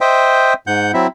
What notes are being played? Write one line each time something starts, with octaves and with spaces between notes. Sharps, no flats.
C5 D#5 E5 G5
G#2 F#5 G6
F#3 C4 E4 E5